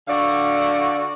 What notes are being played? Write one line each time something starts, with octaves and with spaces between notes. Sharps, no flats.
D3 F#4 D5 F5